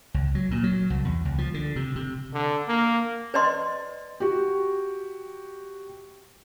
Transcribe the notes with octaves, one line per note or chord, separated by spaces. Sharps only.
C#2
F#3
A#2
F#3
C2
E2
C#2
F3
D3
C3
C3
D3
A#3
B4 D5 D#5 C6
F#4 G4